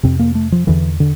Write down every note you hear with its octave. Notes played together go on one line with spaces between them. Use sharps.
F2 C3 C4
A#3
A3
F3
E2 D3 E3
D3